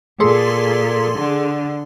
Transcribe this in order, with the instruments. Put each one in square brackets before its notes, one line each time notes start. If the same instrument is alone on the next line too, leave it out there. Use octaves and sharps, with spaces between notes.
[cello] A#2 [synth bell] G#4 A4 C6
[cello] D3